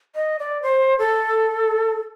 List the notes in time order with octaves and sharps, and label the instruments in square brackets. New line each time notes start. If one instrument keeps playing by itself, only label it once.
[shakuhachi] D#5
D5
C5
A4